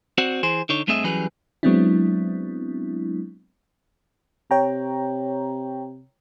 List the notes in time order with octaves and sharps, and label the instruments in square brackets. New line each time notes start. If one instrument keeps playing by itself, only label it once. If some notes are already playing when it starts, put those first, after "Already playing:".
[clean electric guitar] C4 F#4 C5 D5 F#5
E3 G#4 C5
D3 D#4 C#5
G2 A3 C4 G#4 D#5 E5
E3 F#3 G3 C#4 G#4 B4
[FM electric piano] F#3 G#3 B3 C4 D4 E4
[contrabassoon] C3 [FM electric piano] C#5 G5 A#5